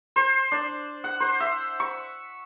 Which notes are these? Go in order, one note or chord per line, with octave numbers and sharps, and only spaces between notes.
C5
D4
F#5
C5
E5
C#6